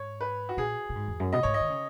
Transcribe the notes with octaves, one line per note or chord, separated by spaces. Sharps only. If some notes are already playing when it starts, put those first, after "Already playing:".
Already playing: G#2 C#5
B4
F#4
A#2 G#4
A#2
G#2
E2
F#2
B2 D#5
G#2 C#5
D#5
D#3
C#3